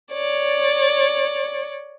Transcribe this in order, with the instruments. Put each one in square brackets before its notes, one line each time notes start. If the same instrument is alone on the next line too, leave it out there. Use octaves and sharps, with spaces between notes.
[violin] C#5 D5